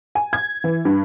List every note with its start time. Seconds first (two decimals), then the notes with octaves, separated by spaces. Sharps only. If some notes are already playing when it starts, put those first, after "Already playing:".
0.15 G#5
0.33 G#6
0.64 E3
0.85 G2